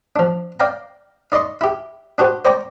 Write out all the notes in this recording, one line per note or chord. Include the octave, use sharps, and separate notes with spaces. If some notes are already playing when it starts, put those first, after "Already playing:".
F3 D4
D5 F5 G5 A#5
D#4 D5 D#5 C6 C#6
E4 G4
D4 F#4 G4 C5
C5 D5 G5 A#5 C#6 D6